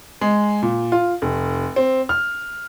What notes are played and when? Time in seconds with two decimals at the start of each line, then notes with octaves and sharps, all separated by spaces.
0.21 G#3
0.62 A#2
0.92 F4
1.22 F1
1.76 C4
2.09 F6